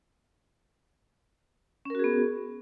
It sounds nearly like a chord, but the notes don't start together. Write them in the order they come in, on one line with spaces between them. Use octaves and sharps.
C#4 A#4 F#4 G#4 B3